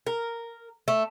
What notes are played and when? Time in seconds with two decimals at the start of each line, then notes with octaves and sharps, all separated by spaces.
0.06 A#4
0.88 A3